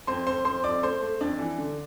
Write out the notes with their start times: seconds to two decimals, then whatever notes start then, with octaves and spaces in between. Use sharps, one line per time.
0.07 F2 C5 C6
0.27 F2 C5 C6
0.45 F2 C5 C6
0.64 F2 D5 D6
0.83 A3 C5 C6
1.01 A3
1.21 F2 D4 D5
1.39 E3
1.58 D3